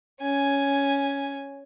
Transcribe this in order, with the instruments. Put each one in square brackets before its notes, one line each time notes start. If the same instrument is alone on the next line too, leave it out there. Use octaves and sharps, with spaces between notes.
[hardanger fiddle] C#4 G#5